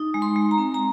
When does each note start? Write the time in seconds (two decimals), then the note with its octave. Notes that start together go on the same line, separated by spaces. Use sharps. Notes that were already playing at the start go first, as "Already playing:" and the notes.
Already playing: D#4
0.14 G#3
0.22 C6
0.36 G#3
0.51 A#5
0.58 C4
0.74 A#5